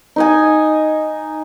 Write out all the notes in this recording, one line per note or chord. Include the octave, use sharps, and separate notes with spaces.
D#4 D#5 G#5